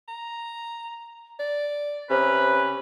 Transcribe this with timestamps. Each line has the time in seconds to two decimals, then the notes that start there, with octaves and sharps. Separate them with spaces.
0.08 A#5
1.39 D5
2.10 C3 C#4 B4